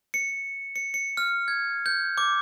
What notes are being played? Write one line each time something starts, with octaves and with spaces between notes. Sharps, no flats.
C#7
C#7
C#7
F6
G#6
G6
D6